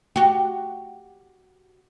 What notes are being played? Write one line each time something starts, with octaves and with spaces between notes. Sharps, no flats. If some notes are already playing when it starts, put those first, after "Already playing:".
F#4 G4